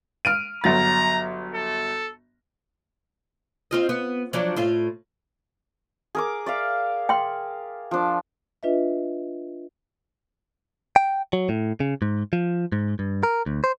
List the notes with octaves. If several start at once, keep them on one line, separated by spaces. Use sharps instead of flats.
F6 D7 D#7
G1 F#3 A#5 A6
A4
C4 F4 D#5
B3
F3 F#3 D4
A2 F4
G#4 A#4 D6
D5 E5 F5
G5 C6
F3 D4
D4 F4 B4 D#5 E5
G5
F#3
A2
C#3
G#2
F3
G#2
G2
A#4
D2
C5